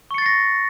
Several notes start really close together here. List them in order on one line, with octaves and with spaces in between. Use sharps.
C#6 C#7 A6 C7 A#6